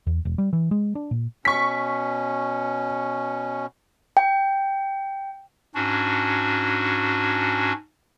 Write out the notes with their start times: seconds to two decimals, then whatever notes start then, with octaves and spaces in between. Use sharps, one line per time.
0.07 E2
0.25 E1
0.38 G3
0.53 E3
0.71 G#3
0.95 D4
1.11 A#2
1.45 B2 C#4 C#6 B6
4.17 G5
5.75 G#2 C#4 D4 F#4